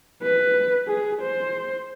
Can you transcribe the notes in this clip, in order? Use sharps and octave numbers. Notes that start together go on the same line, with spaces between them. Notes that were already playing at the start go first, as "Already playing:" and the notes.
B4
G#4
C5